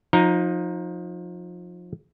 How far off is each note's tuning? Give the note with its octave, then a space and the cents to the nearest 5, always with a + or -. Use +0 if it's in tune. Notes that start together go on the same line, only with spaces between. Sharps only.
F3 +25 D#4 +0 A#5 +0